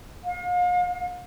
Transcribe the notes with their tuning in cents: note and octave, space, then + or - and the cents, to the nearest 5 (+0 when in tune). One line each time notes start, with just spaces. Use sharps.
F5 +40